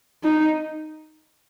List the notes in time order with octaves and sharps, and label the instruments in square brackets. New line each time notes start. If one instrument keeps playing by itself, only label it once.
[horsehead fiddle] D#4